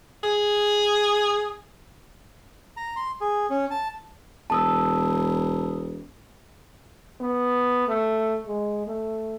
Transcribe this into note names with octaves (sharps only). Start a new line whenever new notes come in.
G#4
A#5
C6
G#4
C#4
A5
E1 A5 D#6 E6
B3
A3
G#3
A3